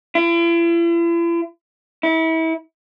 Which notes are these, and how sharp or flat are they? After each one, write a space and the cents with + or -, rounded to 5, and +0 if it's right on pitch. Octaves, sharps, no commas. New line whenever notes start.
E4 +45
E4 -30